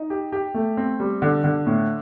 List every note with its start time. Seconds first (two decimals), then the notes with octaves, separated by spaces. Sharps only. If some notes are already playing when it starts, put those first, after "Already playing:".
Already playing: D#4
0.10 G4
0.32 G4
0.54 A3
0.77 C4
1.00 G3
1.22 D3
1.44 D3
1.66 A2